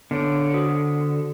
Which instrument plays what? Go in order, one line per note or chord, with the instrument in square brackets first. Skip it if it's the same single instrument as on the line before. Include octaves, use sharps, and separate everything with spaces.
[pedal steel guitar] D3 [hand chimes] B3 C#5 D7
[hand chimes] F#4 C5 D#6